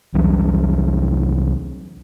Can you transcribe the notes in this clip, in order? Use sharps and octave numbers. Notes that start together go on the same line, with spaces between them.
C2 E3 F#3